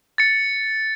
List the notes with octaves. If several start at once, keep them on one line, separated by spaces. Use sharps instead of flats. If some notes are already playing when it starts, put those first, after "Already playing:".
A6 C#7